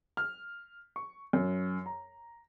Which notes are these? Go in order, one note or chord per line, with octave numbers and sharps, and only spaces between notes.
F6
C#6
F#2
A#5